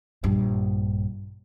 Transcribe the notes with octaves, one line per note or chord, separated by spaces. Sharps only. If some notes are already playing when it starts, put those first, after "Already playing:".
A#1 G2